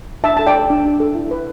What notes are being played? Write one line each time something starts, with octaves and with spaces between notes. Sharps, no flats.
D4 E5 A5
A4 A5
D5 G5
A4
D4
D4
A4
E4
B4